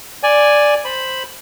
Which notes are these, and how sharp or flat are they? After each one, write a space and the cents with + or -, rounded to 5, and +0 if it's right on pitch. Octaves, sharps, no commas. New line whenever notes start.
D5 +0 G#5 +0
C5 +0 B5 +0